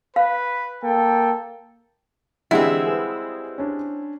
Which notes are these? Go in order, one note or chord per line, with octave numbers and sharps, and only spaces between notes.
B4 F5
A#3 A4 G5
D3 E3 G3 G#3 C4 E4 G#4 F#5
G#4 B4
C#4 D4